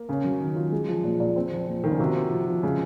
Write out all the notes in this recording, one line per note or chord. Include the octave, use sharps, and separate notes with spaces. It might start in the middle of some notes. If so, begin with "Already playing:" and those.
Already playing: A#3
C#3 C#4
F#3
D#3
F4
G#3
F3
A#2
A#2
C4
F3
A#2
D#3 F4
C#3
C3 F#4
C4
F3
F3
C#3 G#3